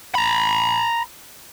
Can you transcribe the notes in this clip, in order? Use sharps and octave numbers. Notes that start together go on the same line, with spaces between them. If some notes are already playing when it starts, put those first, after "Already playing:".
A#5 B5